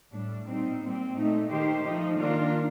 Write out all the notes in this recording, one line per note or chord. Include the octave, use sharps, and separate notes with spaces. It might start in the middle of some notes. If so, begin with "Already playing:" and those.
A2 G3 D4
A#2 G3 C4 D#4
A#2 G3 C4
A#2 A3 D#4
D#3 A3 D#4 G4 C5
F3 A3 D#4
D#3 A#3 D4 F4 A#4